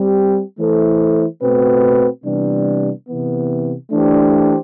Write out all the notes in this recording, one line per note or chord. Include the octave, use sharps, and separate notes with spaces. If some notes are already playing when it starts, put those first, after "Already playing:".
Already playing: G3 C4 G4
E3 A3 E4 A4 C5
B2 A3 C4 F#4 B4
C3 E3 G3 B3 D4
C3 E3 B3
E3 A3 D4 G4 C5